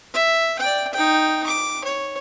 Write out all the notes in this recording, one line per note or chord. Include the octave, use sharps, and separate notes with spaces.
E5
D5 G5
D#4 G5
D6
C#5